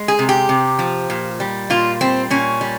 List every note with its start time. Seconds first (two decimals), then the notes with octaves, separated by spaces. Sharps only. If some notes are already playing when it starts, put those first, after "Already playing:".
Already playing: G#3
0.08 G#4
0.19 C3
0.29 G4
0.49 C3
0.79 F3
1.10 A#2
1.40 G3
1.70 A#2 F4
2.01 G3 C4
2.30 A#2 C#4
2.61 G3